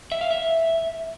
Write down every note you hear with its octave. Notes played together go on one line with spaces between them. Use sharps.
E5
F5
E5